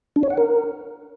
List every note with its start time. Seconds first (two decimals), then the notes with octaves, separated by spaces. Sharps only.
0.16 D4
0.23 C#5
0.30 F#5
0.37 A#4